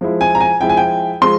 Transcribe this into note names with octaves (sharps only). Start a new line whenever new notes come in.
F3 G#3 E4
G#5
A#5
G#5
F3 G#3 E4 G5
G#5
G5
F3 G#3 C6